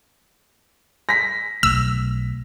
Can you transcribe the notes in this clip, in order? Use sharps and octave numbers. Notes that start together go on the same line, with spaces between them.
A#6 B6
B1 B2 A3 E6